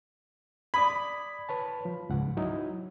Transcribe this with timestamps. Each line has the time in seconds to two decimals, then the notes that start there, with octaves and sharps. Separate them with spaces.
0.74 D5 B5 D#6 G#6
1.49 B4 C#5 A5
1.85 F3
2.09 C#2 G#2 F#5
2.37 F#3 D#4 E4